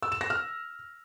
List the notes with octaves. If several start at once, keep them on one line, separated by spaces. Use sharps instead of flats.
E6
E7
A#6
F6